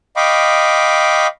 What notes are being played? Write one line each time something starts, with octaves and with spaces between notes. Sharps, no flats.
D#5 F5 G5 B5 C#6 D6